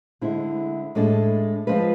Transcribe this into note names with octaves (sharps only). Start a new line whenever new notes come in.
D3 G#3 C4 E4
A2 G#3 D4 A4
F3 G#3 C4 F4 B4